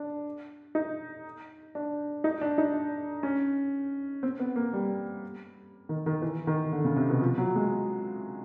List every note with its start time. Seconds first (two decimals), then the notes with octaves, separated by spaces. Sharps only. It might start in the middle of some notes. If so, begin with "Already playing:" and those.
Already playing: D4
0.75 D#4
1.75 D4
2.24 D#4
2.41 D4
2.58 D#4
2.74 D4
3.23 C#4
4.23 C4
4.40 B3
4.56 A#3
4.73 G3
5.89 D#3
6.06 D#3
6.22 E3
6.47 D#3
6.72 D3
6.85 C#3
6.96 C3
7.10 B2
7.21 F3
7.38 F#3
7.55 G#3